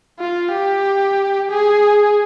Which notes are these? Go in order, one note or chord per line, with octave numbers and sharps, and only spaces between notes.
F4
G4
G#4